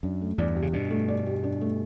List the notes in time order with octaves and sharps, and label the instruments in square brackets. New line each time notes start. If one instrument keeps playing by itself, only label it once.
[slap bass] F#2 [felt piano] D4
[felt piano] A3
[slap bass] E2 G2 [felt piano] D5
[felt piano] G4
[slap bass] C#3
[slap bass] G2 B2 [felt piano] D4
[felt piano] A3
D5
G4
D4
A3